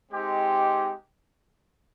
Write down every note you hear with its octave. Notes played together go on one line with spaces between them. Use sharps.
G#3 C4 D#4 G4